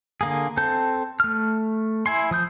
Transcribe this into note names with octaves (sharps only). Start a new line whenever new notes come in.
D3 A#3 G#4
C4 A4 A5 G6
A3 F6
E4 G#5 C6
F3 D#6 G6